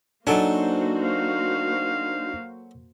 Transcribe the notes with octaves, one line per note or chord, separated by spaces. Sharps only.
F#3 A#3 D4 D#4 F#4 A4 C5 G#5
F5